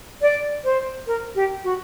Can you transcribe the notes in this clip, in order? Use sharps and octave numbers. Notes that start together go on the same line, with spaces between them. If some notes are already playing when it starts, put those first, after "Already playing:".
D5
C5
A#4
G4
F#4